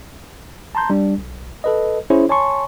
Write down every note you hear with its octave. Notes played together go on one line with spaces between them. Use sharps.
A5 A#5 C6 G6
G3 D4
B1
A4 B4 D#5
C#4 E4 G#4 C5 C#5
C#5 G#5 A5 C6 C#6